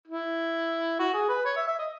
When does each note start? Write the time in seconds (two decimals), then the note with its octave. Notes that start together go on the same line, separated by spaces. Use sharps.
0.08 E4
0.99 F#4
1.14 G#4
1.29 B4
1.45 C#5
1.57 E5
1.68 E5
1.79 D#5